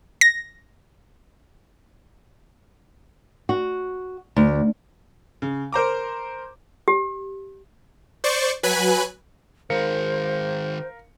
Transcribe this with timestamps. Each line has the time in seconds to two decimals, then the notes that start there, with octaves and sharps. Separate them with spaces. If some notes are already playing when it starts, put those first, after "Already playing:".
0.21 A#6
3.49 F#4
4.36 D2
5.42 C#3
5.73 A#4 C5 A#5 D6
6.88 G4
8.24 C5 D5 C#6
8.63 F#3 B4 G#5 B5 F#6
9.70 D#3 G#3 A#4 C5 F5 C#7